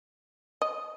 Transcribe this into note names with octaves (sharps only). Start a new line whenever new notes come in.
D#5